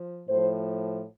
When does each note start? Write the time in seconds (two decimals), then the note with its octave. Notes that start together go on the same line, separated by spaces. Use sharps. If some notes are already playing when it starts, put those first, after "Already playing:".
Already playing: F3
0.27 A2 F3 C5